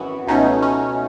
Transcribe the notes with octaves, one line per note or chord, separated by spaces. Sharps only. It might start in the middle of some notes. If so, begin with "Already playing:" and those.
Already playing: G#1 F#2 E3 B3 F#4
C#2 B2 A3 C#4 D#4
C#4